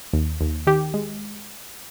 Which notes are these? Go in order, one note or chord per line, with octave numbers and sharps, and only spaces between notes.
D#2
D#2
D#3 G4
G#3